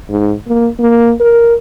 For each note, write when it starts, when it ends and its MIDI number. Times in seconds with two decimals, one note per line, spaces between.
0.10 0.33 44
0.48 0.68 58
0.79 1.12 58
1.20 1.54 70